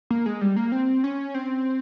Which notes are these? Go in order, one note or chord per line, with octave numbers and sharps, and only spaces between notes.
A#3
G#3
G3
A#3
C4
C#4
C4